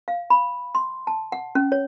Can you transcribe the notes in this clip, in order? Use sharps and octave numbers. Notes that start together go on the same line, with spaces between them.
F5
B5
C6
A5
F#5
C#4
C#5